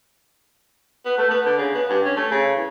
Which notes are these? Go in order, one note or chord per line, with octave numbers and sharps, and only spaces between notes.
B3
A3
B3
D3
C#3
B3
G2
C#4
A3
C#3
E2